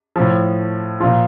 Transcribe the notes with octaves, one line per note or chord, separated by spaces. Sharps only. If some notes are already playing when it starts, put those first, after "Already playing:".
A2 F3
A#2 F3 F4